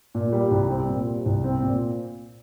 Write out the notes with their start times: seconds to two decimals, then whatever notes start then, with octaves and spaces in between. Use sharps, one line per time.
0.15 A#2
0.33 G3
0.51 C2
0.69 C4
0.88 A#2
1.07 G3
1.26 C2
1.44 C4
1.63 A#2